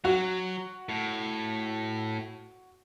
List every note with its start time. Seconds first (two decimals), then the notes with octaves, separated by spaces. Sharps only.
0.05 F#3 F#4
0.89 A2